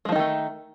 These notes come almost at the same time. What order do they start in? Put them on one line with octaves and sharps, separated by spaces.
G#3 F3 D#4 D#3 A3